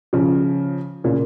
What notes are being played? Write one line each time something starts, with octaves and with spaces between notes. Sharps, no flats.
C#3 F3
A#2 C#3